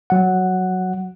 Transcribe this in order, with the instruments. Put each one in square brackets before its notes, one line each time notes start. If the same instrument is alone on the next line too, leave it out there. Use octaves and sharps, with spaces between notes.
[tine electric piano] F#3 F#5